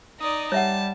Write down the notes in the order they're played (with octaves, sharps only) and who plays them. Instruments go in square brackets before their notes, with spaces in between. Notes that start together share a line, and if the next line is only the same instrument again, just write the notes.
[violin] D#4 D5 [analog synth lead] D#6
[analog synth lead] G3 [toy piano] C#5 E5 F#5 [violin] A5